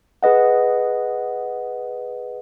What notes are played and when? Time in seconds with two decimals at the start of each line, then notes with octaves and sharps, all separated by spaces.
0.23 G#4 B4 D#5 F#5